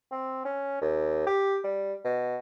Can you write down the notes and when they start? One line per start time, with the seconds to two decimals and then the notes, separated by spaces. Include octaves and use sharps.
0.12 C4
0.45 C#4
0.82 D#2
1.27 G4
1.64 G3
2.05 B2